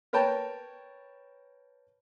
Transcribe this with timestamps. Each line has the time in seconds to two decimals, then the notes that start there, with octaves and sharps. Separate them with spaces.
0.13 A#4 B4 C#5 G5 A5